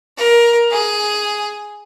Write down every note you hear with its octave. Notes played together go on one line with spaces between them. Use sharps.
A#4
G#4